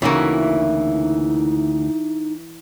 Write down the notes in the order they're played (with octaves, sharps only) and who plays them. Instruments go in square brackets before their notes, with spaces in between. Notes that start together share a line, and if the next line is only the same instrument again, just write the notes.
[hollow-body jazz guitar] D2 C#3 A#3 [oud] E3 F#4 [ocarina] D#4